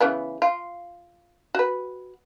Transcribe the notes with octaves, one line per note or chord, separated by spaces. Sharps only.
C#3 E3 B3
F4
F#4 B4